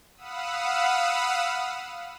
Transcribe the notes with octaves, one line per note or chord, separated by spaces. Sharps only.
F5 F#5 B5 D#6 E6